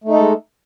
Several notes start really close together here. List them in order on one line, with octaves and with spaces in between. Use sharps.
A3 D#4 A4 G#3